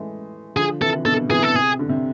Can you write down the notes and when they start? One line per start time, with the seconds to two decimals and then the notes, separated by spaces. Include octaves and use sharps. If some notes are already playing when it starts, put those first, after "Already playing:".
Already playing: E3 G#3 A3
0.57 D3 F3 G#4
0.81 C3 E3 A4
0.94 E3
1.05 B2 D3 A4
1.30 C3 E3 G#4
1.43 A4
1.54 C3 G#4
1.79 D3
1.89 C3